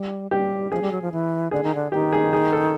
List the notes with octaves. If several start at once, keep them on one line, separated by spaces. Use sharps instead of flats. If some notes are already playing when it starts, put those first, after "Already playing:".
Already playing: G3
G3 G4
F3 G#4
G3
F#3
F3
E3
D3 G#4
D#3
D3
D#3 G4
G#4
G#4
A4